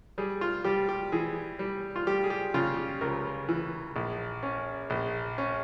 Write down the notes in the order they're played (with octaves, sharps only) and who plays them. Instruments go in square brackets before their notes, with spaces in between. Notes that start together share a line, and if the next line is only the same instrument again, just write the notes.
[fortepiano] G3 G#4
F4
G3 G4
G4
E3 G#4
G3
F4
G3 G4
G#4
G4
C#3 F4
G4
C#2 A#4
E3
A#1
C#4
A#1
C#4